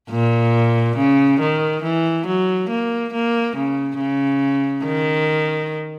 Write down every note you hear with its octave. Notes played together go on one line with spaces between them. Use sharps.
A#2
C#3
D#3
E3
F#3
A#3
A#3
C#3
C#3
D#3